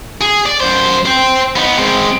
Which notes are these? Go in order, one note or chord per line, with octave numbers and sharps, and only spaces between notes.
G#4
D5
F#2 C5
C5 G5
B3 D#4
G#3 C4